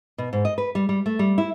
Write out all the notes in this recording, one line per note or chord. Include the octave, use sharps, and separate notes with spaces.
B2
G#2
D#5
B4
G3
G3
A3
G3
E4